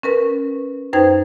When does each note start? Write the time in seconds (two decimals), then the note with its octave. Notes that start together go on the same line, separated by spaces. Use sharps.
0.03 C#4 A#4 B4
0.93 F#2 D#4 B4 C5 G5 G#6